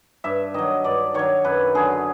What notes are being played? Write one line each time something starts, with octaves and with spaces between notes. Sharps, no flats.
G2 E5
D#3 F#3 D#5
G2 D5
D#3 F#3 C#5
F#2 B4
D3 F#3 G#4